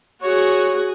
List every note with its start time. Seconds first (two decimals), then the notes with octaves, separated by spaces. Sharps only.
0.22 F#4 G#4 C#5